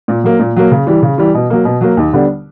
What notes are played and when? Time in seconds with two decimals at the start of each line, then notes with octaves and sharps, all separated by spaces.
0.08 A#2
0.24 F#3 A#3
0.40 A#2
0.56 F#3 A#3
0.71 C#3
0.87 E3 G3
1.02 C#3
1.18 E3 G3
1.34 B2
1.50 F#3 A#3
1.65 B2
1.81 F#3 A#3
1.97 D#2
2.13 D3 G3 B3 D4